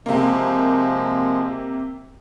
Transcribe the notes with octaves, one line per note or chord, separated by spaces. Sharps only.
C3 F3 G#3 A#3